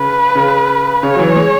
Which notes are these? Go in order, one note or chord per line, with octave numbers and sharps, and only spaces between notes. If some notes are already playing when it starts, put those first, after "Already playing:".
Already playing: C#3 B4
C#3
C#3 C#5
F#3
E3
G#3